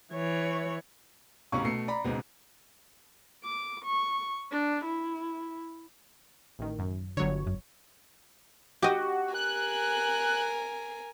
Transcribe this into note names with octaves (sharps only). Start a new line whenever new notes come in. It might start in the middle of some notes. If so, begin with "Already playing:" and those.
E3 C#5
B1 A2 C3 C#4 F5 C#6
B2 A3 C7 C#7
D5 A#5 B5
G#1 C#2 G#2 B2
D6
C#6
D4
E4
A1 D#3
F#2
G1 D3 F#3 C#5
F#2
F#4 G4 D#5
A#4 G#5 F#6